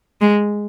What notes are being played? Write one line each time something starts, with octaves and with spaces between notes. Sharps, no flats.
G#3